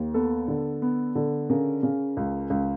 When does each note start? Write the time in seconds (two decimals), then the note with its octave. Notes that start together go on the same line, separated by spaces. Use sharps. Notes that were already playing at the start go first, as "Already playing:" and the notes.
Already playing: D#2
0.14 B3 A4
0.48 D3
0.82 B3
1.15 D3
1.50 C#3 A#4
1.83 C#3
2.17 C#2
2.50 C#2